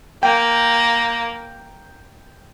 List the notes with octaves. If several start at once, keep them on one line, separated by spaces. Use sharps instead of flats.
A#3 G5